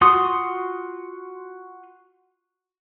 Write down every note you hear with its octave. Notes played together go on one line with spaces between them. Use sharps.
F4 F#4 F#5 C6 D#6